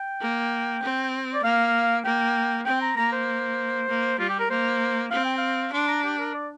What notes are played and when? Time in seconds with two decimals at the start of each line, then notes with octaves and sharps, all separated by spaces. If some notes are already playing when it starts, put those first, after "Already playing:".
Already playing: G5
0.21 A#3
0.83 C4
1.33 D5
1.43 A#3 F5
2.05 A#3 G5
2.66 C4 G5
2.82 A#5
2.97 A#3 A#5
3.12 C5
3.89 A#3
4.19 G3 F4
4.29 G4
4.39 A#4
4.50 A#3 C5
5.11 C4 F5
5.25 G5
5.38 F5
5.73 D4 C6
5.88 A#5
6.04 G4
6.19 A#4
6.34 D5